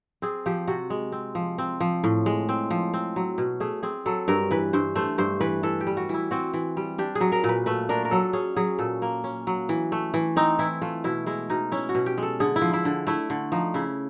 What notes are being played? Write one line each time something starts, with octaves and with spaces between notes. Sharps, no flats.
C4 G#4
F3 G4
C3 F#4
G#3
C4
F3
C4
F3
A2
G#3
C4
F3
C4
F#3
B2
A3 G#4
C4 G#4
F#3 A4
G2 A#4
E3 B4
G2 C5
A3 C5
G2 C5
E3 B4
E3 A4
G4
G3
F#4
E3 E4
C4 F#4
E3
G3
D4 G4
G#4
F#3
A#4
A#2
B4
A3 B4
D4 A#4
A#4
F#3 A4
C#4 G#4
F#3 G#4
A#2 A4
A#3
C#4
F#3
E3
A3
E3
C4 D#4
E3 E4
A3 F4
B2 E4
G#3 E4
B2 D#4
C#4 E4
F#4
B2
G4
G#3
A4
D3 G#4
E4
F3
E4
D3
A3 E4
D3
F3 D#4
C#3 E4